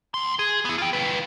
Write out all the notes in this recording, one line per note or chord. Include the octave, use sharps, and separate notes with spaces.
D2 C6
G#4
B3 E4
F4 G5
D#3 B4